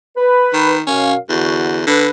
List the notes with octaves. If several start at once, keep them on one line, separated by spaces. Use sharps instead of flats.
B4
D#3
F#2 B2 C#4 F5
E2 D3 F#4
D3 B4